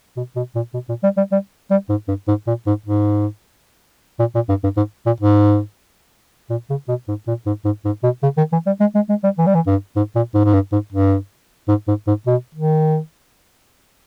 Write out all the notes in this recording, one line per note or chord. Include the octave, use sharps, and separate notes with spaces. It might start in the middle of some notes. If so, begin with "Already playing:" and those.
B2
B2
A#2
B2
A#2
G3
G3
G3
G3
G#2
G2
G#2
A#2
G#2
G#2
A#2
A#2
G2
G2
G#2
A#2
G#2
A#2
C#3
B2
G#2
A#2
G#2
G#2
G#2
B2
C#3
D#3
E3
G3
G#3
G#3
G#3
G3
E3
G3
E3
G2
G#2
A#2
G#2
G#2
G2
G#2
G2
G#2
G#2
G#2
B2
D#3